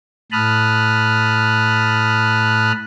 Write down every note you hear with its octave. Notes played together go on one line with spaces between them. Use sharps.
A2 A5 B5 D#6 F6 F#6